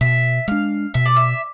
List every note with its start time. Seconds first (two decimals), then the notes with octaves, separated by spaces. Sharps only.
0.01 B2 E5
0.48 G#3 D4 F5
0.94 B2 E5
1.06 D5
1.16 E5